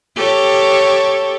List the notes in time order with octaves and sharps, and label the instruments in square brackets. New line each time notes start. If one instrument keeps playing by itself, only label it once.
[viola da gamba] G4 A4 C#5